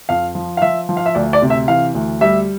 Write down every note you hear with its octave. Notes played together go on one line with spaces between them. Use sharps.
F2 F5
F3
F5
F3 E5
F3
F5
E5
D2 D5
D5
C3
E5
E3 F5
D2
G3 E5